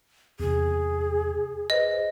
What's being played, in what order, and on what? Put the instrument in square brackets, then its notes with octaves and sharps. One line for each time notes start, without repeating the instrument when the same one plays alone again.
[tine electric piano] E2 C3 [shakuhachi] G#4
[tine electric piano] G#4 B4 C5 [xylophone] D#5